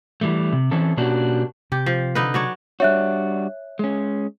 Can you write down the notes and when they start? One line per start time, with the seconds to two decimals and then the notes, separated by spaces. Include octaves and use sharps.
0.21 E3 G3 A3
0.53 C3
0.71 E3 C4 C#4 A4
0.97 B2 A#3 C#4 D4 F#4 G4
1.72 C3 G4
1.86 F3
2.15 D3 D#4 B4
2.34 F#3 D4 C#5
2.80 G3 D4 F#4 C#5 E5 F#6
3.79 G#3 C#4